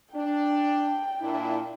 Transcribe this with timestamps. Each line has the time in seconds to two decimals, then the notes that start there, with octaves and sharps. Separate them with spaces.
0.15 D4 G5
1.21 A#2 D4 E4